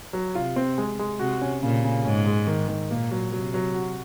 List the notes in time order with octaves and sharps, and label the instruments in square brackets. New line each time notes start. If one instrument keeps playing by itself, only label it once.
[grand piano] F#3
[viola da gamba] C3 [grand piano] F4
[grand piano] C4
G#3
G#3
[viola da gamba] C3 [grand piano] F#4
[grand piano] C#4
[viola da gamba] A#2 [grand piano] C#3
[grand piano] C#3
[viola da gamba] G#2 [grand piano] C#4
[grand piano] G#3
D#3
D#3
[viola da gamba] A#2 [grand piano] A#3
[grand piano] F#3
[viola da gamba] C3 [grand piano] F#3
[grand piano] F#3
F#4